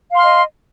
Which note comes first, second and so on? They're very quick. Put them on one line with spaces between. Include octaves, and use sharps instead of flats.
F5 C6 F6 D#5